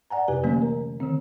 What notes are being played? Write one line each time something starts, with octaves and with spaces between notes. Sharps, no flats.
D5 F#5 G#5 A#5
F2 C3 G4 B4 G#5
D3 E3 F#3 A3 A#3 C#4
A#4 A#5
D3 D#3 C4